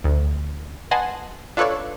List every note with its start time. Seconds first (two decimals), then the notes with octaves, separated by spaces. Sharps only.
0.04 D2
0.91 B4 D#5 F#5 G#5 A5 C6
1.57 D4 F4 A4 B4 C#5 D5